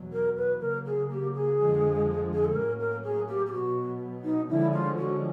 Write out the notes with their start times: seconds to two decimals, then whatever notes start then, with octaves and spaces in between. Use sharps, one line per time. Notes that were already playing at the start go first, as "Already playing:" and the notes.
Already playing: E2 B2 F#3
0.13 A#4
0.36 B4
0.61 C#3 F#3 A#3 A#4
0.85 G#4
1.10 G4
1.34 G#4
1.58 F2 D3 F3 G#3
2.33 G#4
2.44 A4
2.55 A2 F#3 A#3 C#4 A#4
2.79 A#4
3.03 G#4
3.28 G4
3.46 G4
3.52 B2 F#3 B3 F#4
4.24 D#4
4.49 D3 F3 G#3 C#4 E4
4.73 F4
4.97 F#4